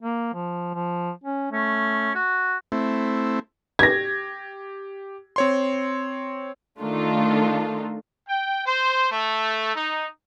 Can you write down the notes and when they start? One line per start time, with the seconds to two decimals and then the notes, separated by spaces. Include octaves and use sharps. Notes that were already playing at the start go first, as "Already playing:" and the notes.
0.01 A#3
0.34 F3
0.74 F3
1.24 C#4
1.51 A3 C#4
2.15 F#4
2.72 A3 C4 E4
3.79 G4 G#6 A#6
5.36 C4 C#5 C6
6.79 D#3 A3 D4 D#4 F4 A4
8.28 G5
8.66 C5
9.11 A3
9.75 D#4